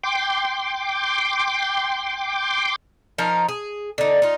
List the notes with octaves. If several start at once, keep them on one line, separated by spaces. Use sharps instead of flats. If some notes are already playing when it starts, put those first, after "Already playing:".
G5 C6 D6
F3 D#4 A#4
G#4
D3 D#4
D#4 F4